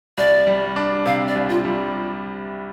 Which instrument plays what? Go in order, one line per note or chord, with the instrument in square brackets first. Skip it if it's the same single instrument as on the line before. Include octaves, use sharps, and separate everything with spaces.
[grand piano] C2 [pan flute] D5
[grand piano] G3
D4
[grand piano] C3 [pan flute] F5
[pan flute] D5
[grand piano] C2
[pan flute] F4
[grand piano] G3